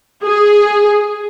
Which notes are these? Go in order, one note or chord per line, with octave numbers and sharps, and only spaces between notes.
G#4